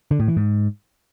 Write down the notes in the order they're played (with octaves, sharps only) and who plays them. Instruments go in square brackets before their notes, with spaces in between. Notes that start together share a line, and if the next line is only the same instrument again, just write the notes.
[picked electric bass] D3
A2
E3
G#2